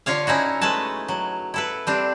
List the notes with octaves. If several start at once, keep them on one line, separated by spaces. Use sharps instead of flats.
D3 F4 C#5 F5
C#4 D#4 E4 F#4
G#3 A3 B4 G#5 A5
F#3
E4 A4 B4
G3 C4 D4